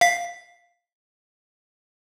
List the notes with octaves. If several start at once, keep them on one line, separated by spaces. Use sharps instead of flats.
F5 B6